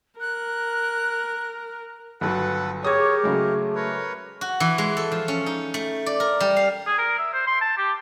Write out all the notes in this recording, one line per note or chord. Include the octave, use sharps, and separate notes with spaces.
A#4 F#6
G1 F#3 A4 B4 F#5
G4 G#4 A#4 C#5 D6 D#6 G#6
C#3 F#3 G#3 A3
A#4 B4 C#5
F#4
E3
G#3
A4
F3
C#4
D#4
A3
D5
A#4
G3
F5
G#4
A#4
E5
C5
C6
A5
G4